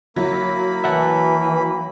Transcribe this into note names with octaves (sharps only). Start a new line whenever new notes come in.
F#3 A#3 E4 B5
E3 E5 F#5 A5